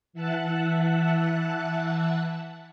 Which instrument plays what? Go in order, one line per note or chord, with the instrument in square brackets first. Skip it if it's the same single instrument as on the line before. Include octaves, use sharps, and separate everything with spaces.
[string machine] E3 E5 F#5 A5 F#6